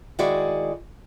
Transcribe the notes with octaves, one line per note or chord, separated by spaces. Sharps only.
D#3 G#3 E4 F#4 G#4 D5